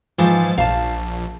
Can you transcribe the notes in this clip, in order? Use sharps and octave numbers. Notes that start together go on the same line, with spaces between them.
G#2 E3 F3 A6
A#1 F5 A5